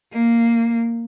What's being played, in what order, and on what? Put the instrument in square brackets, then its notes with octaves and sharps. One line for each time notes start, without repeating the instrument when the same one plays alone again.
[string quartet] A#3